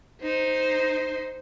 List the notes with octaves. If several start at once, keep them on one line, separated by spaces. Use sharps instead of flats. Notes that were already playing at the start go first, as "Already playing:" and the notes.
D#4 C5